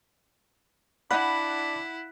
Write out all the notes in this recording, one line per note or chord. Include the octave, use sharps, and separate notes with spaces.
D4 E4 F#5 B5